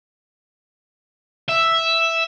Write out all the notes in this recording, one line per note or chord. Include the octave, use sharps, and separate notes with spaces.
E5